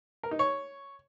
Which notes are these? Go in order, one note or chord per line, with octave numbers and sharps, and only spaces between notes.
A#4
D#4
C#5